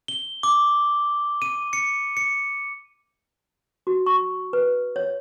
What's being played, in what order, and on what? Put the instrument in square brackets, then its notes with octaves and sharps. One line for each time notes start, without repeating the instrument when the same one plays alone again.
[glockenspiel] G7
D6
D#7
C#7
C#7
[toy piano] F#4
C#6
B4
C#5